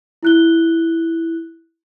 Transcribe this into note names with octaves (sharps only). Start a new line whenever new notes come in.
E4 F#6 G7